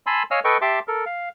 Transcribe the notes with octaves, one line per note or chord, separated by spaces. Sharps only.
G#5 A5 B5 C6 E6
C#5 D#5 F5 G#5 E6 F6
A4 B4 D#5 G5 C#6
G4 E5 A5 C6 D6
A4 A#4
F5